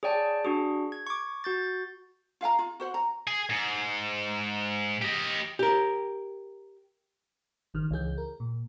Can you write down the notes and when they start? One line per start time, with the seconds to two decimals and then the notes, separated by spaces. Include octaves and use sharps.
0.03 G#4 C#5 D5 G5 A5
0.45 D4 F#4 G#4
0.92 G#6
1.07 C#6 D6
1.44 F#4 G6 A6
2.41 F4 F5 G5 A#5
2.59 F4
2.80 F#4 C5 F#5
2.94 A#5
3.27 G#4
3.49 G#2
5.02 G4 D#5
5.59 G4 A#4
7.74 G#1 D#3 F6
7.91 C#2 E3 G#4 G6
8.18 A#4
8.40 A#2